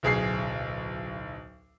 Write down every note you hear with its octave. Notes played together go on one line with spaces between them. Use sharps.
D1 B1 G#4 C7